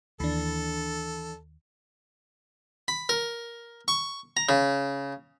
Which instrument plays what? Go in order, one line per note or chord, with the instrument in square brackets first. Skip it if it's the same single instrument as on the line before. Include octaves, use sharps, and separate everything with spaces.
[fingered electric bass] D#2 [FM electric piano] E3 D4 [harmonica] A4
[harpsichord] B5
A#4
C#6
A#5
C#3